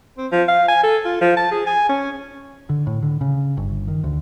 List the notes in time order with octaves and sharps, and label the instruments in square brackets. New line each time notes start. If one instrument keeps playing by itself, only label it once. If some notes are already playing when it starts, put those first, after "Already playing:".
[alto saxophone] C4
F3
F5
G#5
A4
F4
F3
A5
G#4
G#5
C#4
[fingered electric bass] D3
A2
D3
C#3
G1
D#3
D2